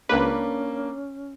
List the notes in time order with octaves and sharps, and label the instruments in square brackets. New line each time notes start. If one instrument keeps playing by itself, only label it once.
[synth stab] C#2 B4 [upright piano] A#3 D4 [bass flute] C#4